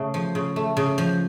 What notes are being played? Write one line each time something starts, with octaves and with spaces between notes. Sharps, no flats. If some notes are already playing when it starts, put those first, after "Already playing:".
Already playing: C#3 A3
F3
C#3
A3
C#3
F3